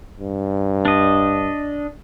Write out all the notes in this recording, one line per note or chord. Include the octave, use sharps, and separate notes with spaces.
G2
D4 D#5